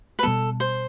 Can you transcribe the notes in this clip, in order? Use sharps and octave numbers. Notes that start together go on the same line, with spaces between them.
B4
B2 G3 B3 A4
C5